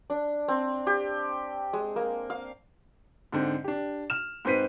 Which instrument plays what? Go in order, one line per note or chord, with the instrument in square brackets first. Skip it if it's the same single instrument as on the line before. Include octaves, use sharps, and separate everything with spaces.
[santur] D4
C4
G4
G#3
A#3
F5
[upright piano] G#2 D3 C4
D4 G4
F6 E7
G#2 C4 B4 C5 B6 D#7